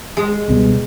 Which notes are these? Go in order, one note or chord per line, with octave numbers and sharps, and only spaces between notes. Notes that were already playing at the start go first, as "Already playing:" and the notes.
G#3
C#2 B2 G3